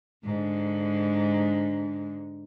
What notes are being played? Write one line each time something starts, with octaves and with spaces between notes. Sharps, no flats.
G#2 D3